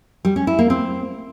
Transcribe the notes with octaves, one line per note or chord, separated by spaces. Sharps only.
G3
C#4
E4
A#3
C4